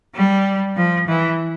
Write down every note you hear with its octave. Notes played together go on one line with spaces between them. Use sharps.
G3
F3
E3